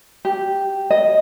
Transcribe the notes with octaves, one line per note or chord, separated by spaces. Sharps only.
G4
D#5